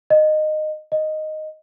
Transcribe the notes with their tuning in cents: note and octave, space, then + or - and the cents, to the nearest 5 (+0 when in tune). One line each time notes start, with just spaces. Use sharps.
D#5 -15
D#5 -5